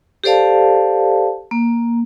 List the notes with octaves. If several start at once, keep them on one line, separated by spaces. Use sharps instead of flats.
G4 A4 C5 D5 F5 A5
A#3